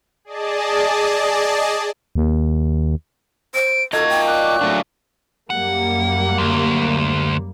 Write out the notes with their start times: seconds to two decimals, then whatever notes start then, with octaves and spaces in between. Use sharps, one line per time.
0.25 G#4 D5 D#5 A5
2.15 D#2
3.54 C5 D7
3.93 A#3 D#4 F4 F#4 A4 D#5 G#6
4.09 G5
4.27 C#5 D5 F#6
4.61 F#3 A3 D4 F4
5.50 F#2 G3 A#3 F#5
6.38 D2